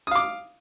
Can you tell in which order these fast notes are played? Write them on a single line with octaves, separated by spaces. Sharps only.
D#6 F5 D6